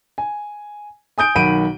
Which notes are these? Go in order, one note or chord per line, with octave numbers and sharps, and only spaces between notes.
G#5
G#5 D#6 G6 D7
B1 D#3 F#5 B5 D7 D#7